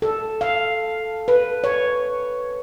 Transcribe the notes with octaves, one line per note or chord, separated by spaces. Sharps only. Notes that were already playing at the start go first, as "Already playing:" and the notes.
A4
F5
B4
C#5